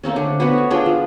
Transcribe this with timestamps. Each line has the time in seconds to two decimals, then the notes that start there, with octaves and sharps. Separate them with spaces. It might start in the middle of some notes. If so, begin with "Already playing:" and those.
0.03 A3 A#3 C4 C#4
0.16 D3 D4
0.40 B3 C#4 F#4 B4
0.57 C#5
0.70 D4 F4 G#4 G5
0.86 F3